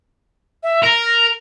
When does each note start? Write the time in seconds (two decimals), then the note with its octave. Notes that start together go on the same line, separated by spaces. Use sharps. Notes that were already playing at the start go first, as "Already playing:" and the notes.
0.63 E5
0.84 A#4 A#6